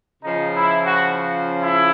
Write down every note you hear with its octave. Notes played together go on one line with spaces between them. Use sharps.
C#3 F3 D#4
E4
F#4
E4